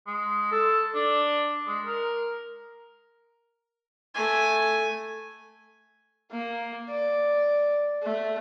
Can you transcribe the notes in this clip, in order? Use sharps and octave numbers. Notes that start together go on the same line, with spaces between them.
G#3
A4
D4
G#3
A#4
A3 G#5
A#3
D5
A3